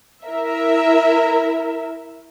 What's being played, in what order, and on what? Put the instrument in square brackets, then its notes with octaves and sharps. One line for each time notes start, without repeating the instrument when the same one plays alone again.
[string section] E4 A#4 E5